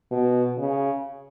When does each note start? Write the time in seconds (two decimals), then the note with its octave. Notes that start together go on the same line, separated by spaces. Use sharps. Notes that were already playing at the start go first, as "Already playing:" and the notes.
0.11 B2
0.58 C#3